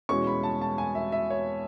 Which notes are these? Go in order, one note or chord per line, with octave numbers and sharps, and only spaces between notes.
E2 B2 G#3 C#4 C#6
B5
A5
A5
G#5
E5
E5
C#5